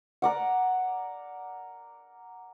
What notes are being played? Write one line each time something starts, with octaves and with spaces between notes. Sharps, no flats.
A#4 D5 F#5